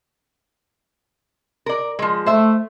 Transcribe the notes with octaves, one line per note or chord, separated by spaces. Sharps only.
A#4 D5
F3 G#3
A3 C5 E5